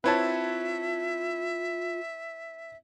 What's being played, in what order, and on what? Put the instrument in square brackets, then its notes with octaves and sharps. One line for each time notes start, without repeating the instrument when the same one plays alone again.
[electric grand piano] C4 E4 [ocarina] F4 [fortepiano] B4 C#5 A5 [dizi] E5